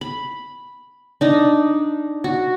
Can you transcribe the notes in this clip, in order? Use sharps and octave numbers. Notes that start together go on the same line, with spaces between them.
B5
D4 D#4
F#4